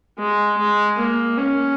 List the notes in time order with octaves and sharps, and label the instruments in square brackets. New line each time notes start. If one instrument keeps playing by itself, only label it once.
[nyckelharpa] G#3
G#3
A#3
C#4